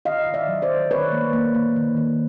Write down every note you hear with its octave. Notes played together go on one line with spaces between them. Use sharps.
D#3 D#5 F5
D#3
D5 E5
F#3
C5 D5
D#3
D#3 B4 C#5
A#3
A#3
A#3
D#3
A#3